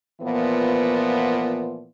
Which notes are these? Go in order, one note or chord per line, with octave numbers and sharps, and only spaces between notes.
A#2 E3 F3 B3